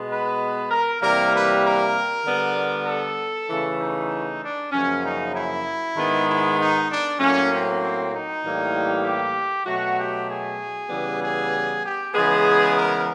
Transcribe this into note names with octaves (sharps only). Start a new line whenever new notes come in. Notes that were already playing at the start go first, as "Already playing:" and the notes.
Already playing: B2 G#3 B3
B4
A#4
C3 E3 G3 A#3 A#4
B4
A#4
D3 G3 B3
A4
C#3 E3 A3
D#4
D4
F#2 C#3 F3 A#3 C#4
D#4
E4
G#2 D#3 G#3 B3
E4
D#4
D4
A2 F#3 A#3 C#4
C4
C4
D#4
A2 E3 G3 A#3
G4
B2 F#3 A3 F#4
G4
G#4
C#3 E3 G3 B3
G#4
G4
C#3 E3 G#3 B3 G#4
A#4